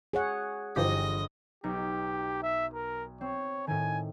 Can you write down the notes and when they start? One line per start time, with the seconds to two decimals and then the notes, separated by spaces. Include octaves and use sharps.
0.13 G#4 C#5 F#5
0.76 G1 E3 F3 G4 D#5 A#6
1.64 B1 D#4 G4 C#7
2.42 E5
2.74 A#4
3.21 C4 C#5
3.67 A2 D#3 G#5